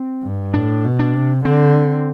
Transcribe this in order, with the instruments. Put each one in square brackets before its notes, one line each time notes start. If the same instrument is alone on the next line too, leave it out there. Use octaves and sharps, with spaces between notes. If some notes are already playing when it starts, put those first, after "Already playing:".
Already playing: [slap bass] C4
[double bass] G2
[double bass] A2 [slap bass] D4
[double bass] B2
[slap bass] D4
[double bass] C3
[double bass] D3 [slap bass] C4